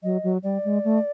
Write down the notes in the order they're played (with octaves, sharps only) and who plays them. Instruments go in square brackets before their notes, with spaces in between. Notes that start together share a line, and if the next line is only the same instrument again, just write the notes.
[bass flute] F#3 [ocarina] D#5
[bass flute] F#3
[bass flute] G3 [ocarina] D5
[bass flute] G#3
A3